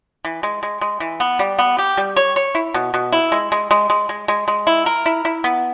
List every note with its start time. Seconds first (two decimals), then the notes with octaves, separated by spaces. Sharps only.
0.25 E3
0.43 G#3
0.63 G#3
0.81 G#3
1.00 E3
1.20 B3
1.39 G3
1.59 B3
1.78 G4
1.97 G3
2.16 C#5
2.36 C#5
2.55 E4
2.74 B2
2.94 B2
3.13 E4
3.32 G#3
3.52 G#3
3.71 G#3
3.90 G#3
4.09 G#3
4.28 G#3
4.48 G#3
4.67 E4
4.86 A#4
5.06 E4
5.25 E4
5.44 B3